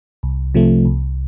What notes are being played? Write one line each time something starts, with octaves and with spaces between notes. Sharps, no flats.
C2
C3 F3 A3
C2